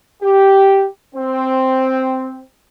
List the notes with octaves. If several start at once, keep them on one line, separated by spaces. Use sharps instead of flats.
G4
C4